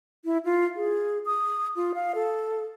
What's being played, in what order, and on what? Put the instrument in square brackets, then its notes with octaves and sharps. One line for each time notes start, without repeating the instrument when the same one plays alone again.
[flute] E4
F4
G#4
D#6
F4
F5
A4